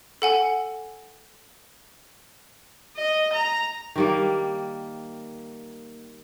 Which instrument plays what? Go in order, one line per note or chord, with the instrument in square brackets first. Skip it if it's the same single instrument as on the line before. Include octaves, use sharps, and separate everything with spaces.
[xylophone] A4 F#5 G#5
[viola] D#5
A#5
[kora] D#3 G3 A#3